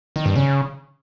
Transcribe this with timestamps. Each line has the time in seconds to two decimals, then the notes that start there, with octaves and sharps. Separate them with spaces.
0.16 D#3
0.26 G2
0.36 C#3